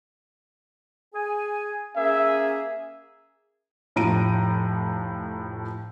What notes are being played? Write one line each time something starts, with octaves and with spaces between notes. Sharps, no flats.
G#4 G#5
A#3 C#4 G#4 E5
F1 A2 F3 A#5 D7 D#7